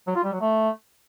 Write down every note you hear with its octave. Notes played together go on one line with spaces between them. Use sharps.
F#3
F4
G3
F#3
A3